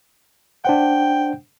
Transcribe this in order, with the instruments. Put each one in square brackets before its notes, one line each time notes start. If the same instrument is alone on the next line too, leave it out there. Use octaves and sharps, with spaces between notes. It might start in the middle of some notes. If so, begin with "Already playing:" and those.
[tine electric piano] D4 C5 F#5 [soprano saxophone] G5